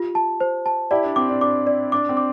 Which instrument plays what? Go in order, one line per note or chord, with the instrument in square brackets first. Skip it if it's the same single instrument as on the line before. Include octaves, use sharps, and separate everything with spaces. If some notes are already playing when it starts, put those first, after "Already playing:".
Already playing: [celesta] F4 G4
A5
C5
A5
[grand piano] E4 G4 [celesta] D5
[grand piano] D4
[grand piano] C4 [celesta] D6
[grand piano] D4
[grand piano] D4 [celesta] D6
[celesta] D5
[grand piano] D4 [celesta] D6
[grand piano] C4
[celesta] D6